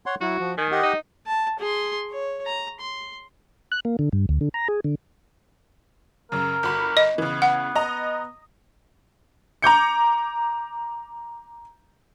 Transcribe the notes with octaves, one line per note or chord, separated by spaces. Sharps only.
C#5 F#5 C6
F#3 E4 F#4
F3
D#3 G#5
G4 D#5 F#5
D#4
A5
G#4 C6
C#5
A#5
C6
F#6
A#3
D3
G2
D2
D3
A#5
G#4
D3
F#2 C#3 A#4
G1 F#4 B5
D#5
C#3 E3 B3
F#5
D#5 A#5 D#6
A#5 D6 G6 C#7